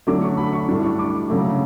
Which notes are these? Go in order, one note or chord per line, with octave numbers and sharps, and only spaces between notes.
D3 F#3 A3 D4 D6
C#6
B5
C#6
A2 G3 D4
C#6
D6
C#3 F#3 A3